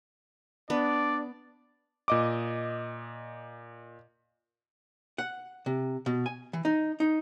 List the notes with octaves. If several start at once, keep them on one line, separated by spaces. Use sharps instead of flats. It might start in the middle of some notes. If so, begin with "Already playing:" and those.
B3 D4 D5
A#2 D#5 D6
F#5
C3
B2
G#5
E3
D#4
D#4